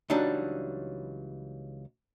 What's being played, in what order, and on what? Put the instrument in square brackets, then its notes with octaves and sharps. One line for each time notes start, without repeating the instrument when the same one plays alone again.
[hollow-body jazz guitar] C#2 E3 F#3 G3 D4 D#4